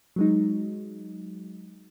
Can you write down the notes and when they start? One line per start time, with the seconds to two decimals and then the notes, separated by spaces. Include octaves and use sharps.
0.16 F#3 G#3 D#4